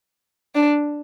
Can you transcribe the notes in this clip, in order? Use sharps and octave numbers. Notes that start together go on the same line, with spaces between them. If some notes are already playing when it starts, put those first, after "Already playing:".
D4